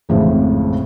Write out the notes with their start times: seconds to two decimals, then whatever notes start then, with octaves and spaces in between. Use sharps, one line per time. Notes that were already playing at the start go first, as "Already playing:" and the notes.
0.09 G#1 F2 A2 C#3 E3